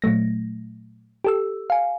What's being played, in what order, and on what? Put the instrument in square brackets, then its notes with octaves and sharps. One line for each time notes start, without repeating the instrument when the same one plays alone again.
[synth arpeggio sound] A#2 F#3 A3 A#6
G4 A4 E6
F5 G#5